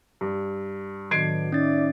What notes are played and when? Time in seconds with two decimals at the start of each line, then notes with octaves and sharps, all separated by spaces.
0.21 G2
1.11 A2 D#3 F#3 B3 D4 G#6 C7 D7
1.52 C#4 D#4 D5 E5 A6